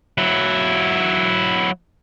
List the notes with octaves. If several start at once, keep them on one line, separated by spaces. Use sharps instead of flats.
F#3 E4